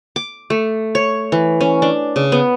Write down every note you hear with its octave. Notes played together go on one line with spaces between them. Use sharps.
D6
A3
C#5
E3
C#4
D4
C#3
B3